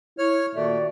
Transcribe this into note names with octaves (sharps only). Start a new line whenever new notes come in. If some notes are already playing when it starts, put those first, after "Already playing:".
E4 C#5 F6
A#2 D#3 A3 F#4 D5